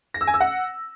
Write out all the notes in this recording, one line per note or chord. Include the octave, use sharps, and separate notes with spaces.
A#6
E6
G#5
E6
F#5